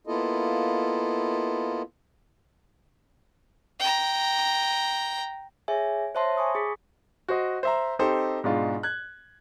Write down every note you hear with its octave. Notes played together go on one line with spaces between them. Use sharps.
A#3 B3 E4 F4 A4 D#5
G5 A#5
G#4 C#5 E5 G#5
C5 C#5 E5 A5 C6
G#5 B5 C#6 D#6
G#4 D6 B6
F#4 C5 D#5
C5 E5 A#5
C4 D#4 G4 A4 C5
G#2 B2 G#3 D4 F4
F#6 G#6